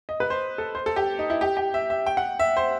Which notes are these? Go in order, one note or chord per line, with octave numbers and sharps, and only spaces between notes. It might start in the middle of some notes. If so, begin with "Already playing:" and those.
D#5
B4
C5
A4
C5
A4
G4
D#4
E4
G4
G4
E5
E5
G5
F#5
E5
C5